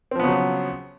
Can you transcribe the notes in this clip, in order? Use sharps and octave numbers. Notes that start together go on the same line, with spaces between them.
C#3 F3 F#3 B3 C4